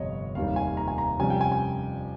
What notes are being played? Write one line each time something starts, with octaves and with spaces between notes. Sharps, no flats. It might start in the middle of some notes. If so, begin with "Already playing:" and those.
Already playing: G1 F2 C3 C#5 D#5
F1 D#2 D#3 G3 F5
G#5
A#5
G#5
A#5
F2 C3 G3 C#4 G#5
G5
G#5
G#5